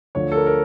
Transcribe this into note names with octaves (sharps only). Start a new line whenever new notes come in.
D2 D3 F3 C#5
A4
A#4
A#4